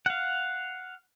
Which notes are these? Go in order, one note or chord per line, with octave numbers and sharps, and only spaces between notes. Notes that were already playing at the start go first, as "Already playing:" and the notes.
F5 F#5